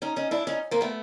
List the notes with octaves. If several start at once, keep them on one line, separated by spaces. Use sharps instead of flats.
C#4 D#4
C#4 D#4
D4 E4
C#4 D#4
A#3 C4
A3 B3